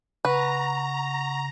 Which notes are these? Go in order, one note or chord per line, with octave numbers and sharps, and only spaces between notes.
C#3 B4 F#5 A#5 C#6